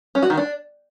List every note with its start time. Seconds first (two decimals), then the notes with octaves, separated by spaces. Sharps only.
0.15 C#4
0.22 F#4
0.30 D#3
0.37 D4